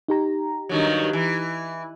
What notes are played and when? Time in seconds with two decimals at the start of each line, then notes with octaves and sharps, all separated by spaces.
0.08 D#4 G4 A#5
0.69 G2 D#3 F#3
1.13 E3